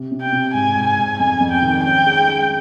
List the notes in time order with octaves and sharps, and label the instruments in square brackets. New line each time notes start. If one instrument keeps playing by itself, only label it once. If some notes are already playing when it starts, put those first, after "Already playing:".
Already playing: [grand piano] C3
C3
[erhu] G5
[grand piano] C3
[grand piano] G#2 [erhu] G#5
[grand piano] G#2
[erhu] G#5
[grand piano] G#2
[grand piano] F2 [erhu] G#5
[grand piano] F2
[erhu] G5
[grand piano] D#3
[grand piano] C#4 [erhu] G5
[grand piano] G#3
G#3